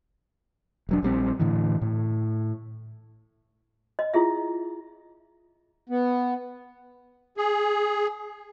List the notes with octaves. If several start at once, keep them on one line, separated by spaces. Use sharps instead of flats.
E1 F#3 D4
A#1 G3 C4
A2 D3 E3
A2
D#5
E4 F4 G#4 E5
B3
G#4